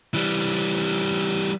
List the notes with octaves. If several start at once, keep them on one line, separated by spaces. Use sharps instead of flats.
E3 G3